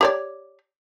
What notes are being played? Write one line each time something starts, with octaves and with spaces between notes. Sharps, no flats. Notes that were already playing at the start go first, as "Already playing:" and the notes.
G4 C#5 D5